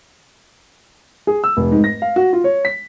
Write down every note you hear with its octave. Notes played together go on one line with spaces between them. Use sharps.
G#4
E6
F1
G#2
A#6
F5
F#4
F4
C#5
B6